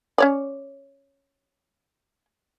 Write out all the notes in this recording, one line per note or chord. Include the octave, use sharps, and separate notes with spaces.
C#4 C#5 D5